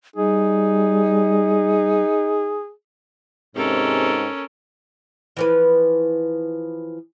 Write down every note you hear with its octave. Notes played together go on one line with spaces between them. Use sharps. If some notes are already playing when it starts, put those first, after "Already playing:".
G3 D#4 G#4
G#2 C3 C#4 A4 A#4
E3 F3 B4